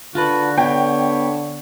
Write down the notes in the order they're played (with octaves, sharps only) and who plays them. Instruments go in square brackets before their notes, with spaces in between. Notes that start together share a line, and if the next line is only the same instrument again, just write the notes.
[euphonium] D3 [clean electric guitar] F4 A4 B4 [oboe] F#4
[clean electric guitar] B3 [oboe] C#5 [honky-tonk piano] G5